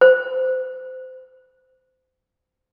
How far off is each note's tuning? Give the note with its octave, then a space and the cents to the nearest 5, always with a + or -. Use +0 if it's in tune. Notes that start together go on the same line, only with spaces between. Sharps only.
C5 -25